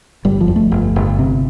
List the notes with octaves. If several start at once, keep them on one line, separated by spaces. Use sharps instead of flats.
G1 G3
F3
F2
A3
G1
G1
C3